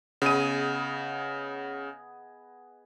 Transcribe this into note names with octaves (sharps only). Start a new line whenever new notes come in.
C#3 B3 G#4 D#5 D#7